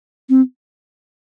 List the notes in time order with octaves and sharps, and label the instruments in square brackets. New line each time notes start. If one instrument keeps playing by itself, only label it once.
[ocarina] C4